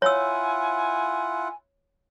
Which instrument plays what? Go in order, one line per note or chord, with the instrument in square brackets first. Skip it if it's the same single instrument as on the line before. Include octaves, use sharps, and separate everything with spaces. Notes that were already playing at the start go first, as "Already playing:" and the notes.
[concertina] E4 F4 F#5 [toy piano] C#5 E6 [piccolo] G#5